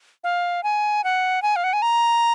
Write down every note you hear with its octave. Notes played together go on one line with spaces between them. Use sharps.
F5
G#5
F#5
G#5
F5
F#5
G#5
A#5